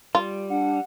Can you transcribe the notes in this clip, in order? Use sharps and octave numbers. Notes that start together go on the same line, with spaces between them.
G3 F4
D4 F#5